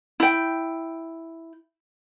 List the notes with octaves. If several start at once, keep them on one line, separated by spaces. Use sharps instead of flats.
E4 G5